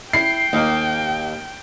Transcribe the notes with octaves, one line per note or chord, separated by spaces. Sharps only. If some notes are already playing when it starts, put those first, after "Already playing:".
E4 G5 C7
D#2 A#3 D#4